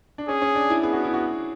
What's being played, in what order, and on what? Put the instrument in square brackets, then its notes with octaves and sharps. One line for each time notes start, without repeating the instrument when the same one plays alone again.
[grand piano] D4
[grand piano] C#4 [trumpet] G#4
[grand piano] C#4
D4
E4
[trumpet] B3 [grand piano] G#4
[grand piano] F#4
E4
F#4